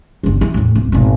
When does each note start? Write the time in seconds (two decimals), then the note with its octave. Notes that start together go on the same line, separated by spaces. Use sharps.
0.23 G1 D3
0.41 E3
0.54 E2 A2
0.75 D1
0.92 G#1 B2